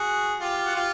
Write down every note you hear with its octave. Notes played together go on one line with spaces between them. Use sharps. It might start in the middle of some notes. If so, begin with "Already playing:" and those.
Already playing: F#4 G#4
F4 G4
F#4
F4 G4